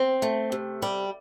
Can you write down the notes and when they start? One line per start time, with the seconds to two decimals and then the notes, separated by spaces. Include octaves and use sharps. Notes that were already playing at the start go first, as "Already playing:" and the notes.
Already playing: C4
0.22 A3
0.52 C3
0.82 G3